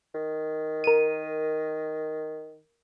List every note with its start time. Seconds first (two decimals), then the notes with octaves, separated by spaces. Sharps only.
0.14 D#3
0.84 A#4 D#7